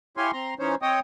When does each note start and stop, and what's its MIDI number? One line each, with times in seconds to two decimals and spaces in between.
0.17 0.31 64
0.17 0.31 67
0.17 0.31 73
0.17 0.31 77
0.17 0.31 80
0.17 0.31 84
0.33 0.54 60
0.33 0.54 82
0.33 0.54 84
0.59 0.75 52
0.59 0.75 61
0.59 0.75 63
0.59 0.75 72
0.59 0.75 73
0.82 1.00 60
0.82 1.00 73
0.82 1.00 75
0.82 1.00 79
0.82 1.00 87